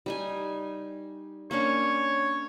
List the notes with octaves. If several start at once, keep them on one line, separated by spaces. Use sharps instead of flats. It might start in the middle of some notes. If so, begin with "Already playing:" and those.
G3 D#4 G#5
A#3 C#4 D4 C#5